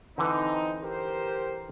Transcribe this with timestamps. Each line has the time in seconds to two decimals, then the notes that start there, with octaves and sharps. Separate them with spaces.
0.18 D3 E3 C4 D#4 B4
0.83 G4 A#4 C5